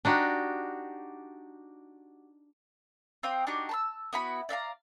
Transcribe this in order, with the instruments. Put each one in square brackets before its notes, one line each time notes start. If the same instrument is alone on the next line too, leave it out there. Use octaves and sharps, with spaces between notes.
[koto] D4 D#4 F#4 G4
[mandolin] C4 F5 G5 D#6
D4 D#4 F#4 G4
A5 B5 E6
B3 E4 F#4 B5
D5 E5 F5 A#5